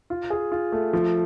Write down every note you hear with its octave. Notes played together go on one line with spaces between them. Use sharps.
F4
G#4
F4
A3
F3